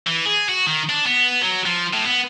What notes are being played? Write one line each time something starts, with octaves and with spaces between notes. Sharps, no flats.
E3
G#4
F#4
D#3
D4
B3
F#3
F3
A2
B3